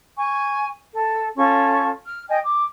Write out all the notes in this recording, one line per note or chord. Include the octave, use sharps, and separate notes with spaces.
G#5 C#6
A4
C#4 F4 A4 C#6
F6
D#5 G5 G#5
D6